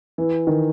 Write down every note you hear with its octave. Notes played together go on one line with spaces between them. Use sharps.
E3
D#3